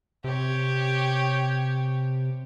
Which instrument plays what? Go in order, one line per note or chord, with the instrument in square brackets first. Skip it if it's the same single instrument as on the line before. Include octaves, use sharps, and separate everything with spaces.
[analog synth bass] C3 [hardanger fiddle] G4 C#5